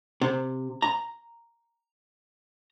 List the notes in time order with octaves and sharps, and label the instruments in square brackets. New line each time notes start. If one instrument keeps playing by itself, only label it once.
[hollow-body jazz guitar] C3
A#5